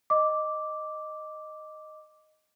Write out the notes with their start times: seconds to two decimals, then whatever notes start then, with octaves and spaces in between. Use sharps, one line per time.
0.10 D#5 D6